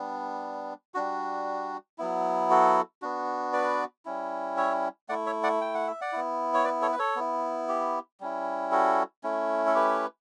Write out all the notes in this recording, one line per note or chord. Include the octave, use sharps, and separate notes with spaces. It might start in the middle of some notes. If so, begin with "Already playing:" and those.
Already playing: G3 B3 D4
G3 D4 F#4
F#3 B3 E4
F#4 A4
B3 D4 F#4
B4 D5
G3 C#4 E4
C#5 E5
A3 E4 D5 F#5
C#5 E5
D5 F#5
G5
F#5
E5
D5 F#5
B3 E4
C#5
B4 D5
A4 C#5
B4
A4 C#5
B3 E4
G4
G3 C#4 E4
F#4 A4
A3 C#4 E4
A4
G4 B4